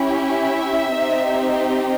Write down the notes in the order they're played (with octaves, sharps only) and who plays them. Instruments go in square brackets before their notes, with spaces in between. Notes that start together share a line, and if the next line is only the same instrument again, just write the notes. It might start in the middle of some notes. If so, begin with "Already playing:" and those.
Already playing: [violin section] C#4 E4 G4
E5
C4 D#4 G4